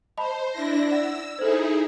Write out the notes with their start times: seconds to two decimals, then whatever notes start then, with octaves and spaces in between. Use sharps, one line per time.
0.17 C5 D#5 A5 B5
0.51 D4 E4 A#6
0.88 D5 F#5 E6
1.39 D#4 E4 G#4 A4 C5